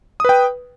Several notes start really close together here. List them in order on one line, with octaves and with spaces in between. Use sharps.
D#6 B4 G5